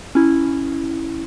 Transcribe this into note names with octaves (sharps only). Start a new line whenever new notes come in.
C#4 E4